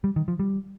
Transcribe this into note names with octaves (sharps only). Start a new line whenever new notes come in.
G3
D#3
F3
G3